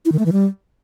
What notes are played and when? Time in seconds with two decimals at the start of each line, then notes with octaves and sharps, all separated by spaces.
0.05 E4
0.12 D#3
0.19 A3
0.26 E3
0.32 G3